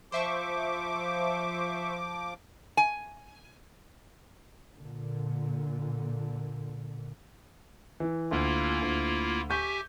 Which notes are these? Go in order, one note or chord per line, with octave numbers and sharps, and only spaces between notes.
F3 C5 E5 C#6 D6
G#5
A#2 D3
E3
D2 A#3 E4 F4
D2
G4 E5 G#5 C#6 G6